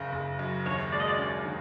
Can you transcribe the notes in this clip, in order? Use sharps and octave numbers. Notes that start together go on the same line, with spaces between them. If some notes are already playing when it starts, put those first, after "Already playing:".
Already playing: F#1 C#3
F#1
F#2
D#2 C#5
G#3 D5
D#5
D5
C#4 D5
D#3